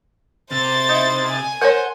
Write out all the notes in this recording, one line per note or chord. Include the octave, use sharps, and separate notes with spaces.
C3 C5 A6
D#4 E4
G#5
A4 A#4 C5 C#5 F#5